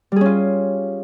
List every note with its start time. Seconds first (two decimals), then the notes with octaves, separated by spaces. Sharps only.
0.12 G3
0.16 G#4
0.21 C#4
0.26 F4